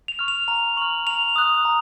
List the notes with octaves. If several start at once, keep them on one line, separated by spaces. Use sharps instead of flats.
F7
C#6 F6
F7
A#5 F7
C#6 F6 F#7
A#5 F7
D#6 F#6
A#5